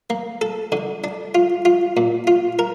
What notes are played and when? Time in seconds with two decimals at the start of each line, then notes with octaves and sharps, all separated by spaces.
0.10 A#3
0.41 A4
0.72 D3
1.04 D4
1.35 F4
1.65 F4
1.97 A#2
2.27 F4
2.59 A#4